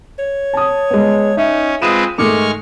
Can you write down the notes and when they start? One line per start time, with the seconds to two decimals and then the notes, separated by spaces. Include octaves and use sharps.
0.19 C#5
0.53 A5 D#6
0.90 G#3 B3
1.37 C#4 D#4 E5
1.82 G#3 C4 F4 B4 D#6 D#7 E7
2.18 G#2 D#3 G#3 A3 C#6 D6 F6